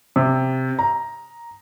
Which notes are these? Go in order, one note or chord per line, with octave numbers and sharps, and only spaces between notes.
C3
A#5